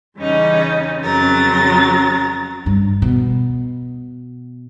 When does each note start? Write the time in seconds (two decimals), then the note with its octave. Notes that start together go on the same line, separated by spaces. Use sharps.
0.18 E2 C#3 G3 C#4 D#4
1.01 F2 C#3 F#3 A#4 A6
2.66 G2
3.02 B2